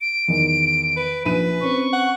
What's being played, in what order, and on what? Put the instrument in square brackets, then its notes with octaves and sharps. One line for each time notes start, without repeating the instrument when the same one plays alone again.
[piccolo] D7
[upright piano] E2 D#3
[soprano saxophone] B4
[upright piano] A#1 D#7 [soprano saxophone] B4
[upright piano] C4 C#4 C5 [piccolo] C#6
[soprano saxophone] F#5